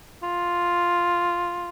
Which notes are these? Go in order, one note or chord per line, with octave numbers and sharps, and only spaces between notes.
F4